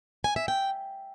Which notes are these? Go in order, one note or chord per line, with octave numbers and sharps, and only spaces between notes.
G#5
E5
G5